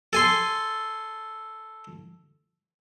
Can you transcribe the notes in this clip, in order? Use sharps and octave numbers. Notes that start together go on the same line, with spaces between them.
A4 G#5 C6